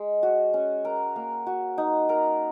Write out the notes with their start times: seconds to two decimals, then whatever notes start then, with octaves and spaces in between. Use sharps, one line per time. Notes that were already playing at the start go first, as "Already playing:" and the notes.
Already playing: G#3
0.23 F#4
0.54 C#4
0.85 A#4
1.16 A#3
1.46 F#4
1.78 D#4
2.09 A#4